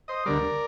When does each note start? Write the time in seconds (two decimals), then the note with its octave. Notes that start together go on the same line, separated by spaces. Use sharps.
0.08 C5 D#5
0.26 D2 D3 G3 A#4 D5